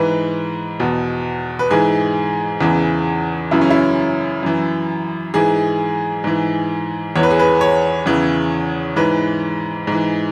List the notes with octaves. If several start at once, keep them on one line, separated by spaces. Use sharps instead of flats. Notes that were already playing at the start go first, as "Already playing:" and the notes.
Already playing: G#2 E3 B4
E2 B2
B4
G#2 E3 G#4
E2 C#3 E3
F#2 C#3 E3 E4
C#4
E4
F#2 E3
G#2 E3 G#4
G#2 E3
E2 E3 C#5
B4
G#4
B4
C#5
E2 C#3 E3
G#2 E3 B4
G#2 E3